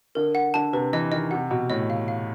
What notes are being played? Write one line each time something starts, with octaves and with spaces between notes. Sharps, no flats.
D3 A#4
F#5
D3 A5
C3 B4
E3 D#5
D#3 D#5
C3 F#5
B2 D#5
A2 D#5
F5
F5